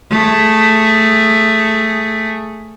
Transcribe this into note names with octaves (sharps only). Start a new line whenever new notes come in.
A3 G#4